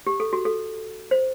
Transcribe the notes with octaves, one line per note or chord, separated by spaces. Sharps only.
G4
A4
F#4
A4
C5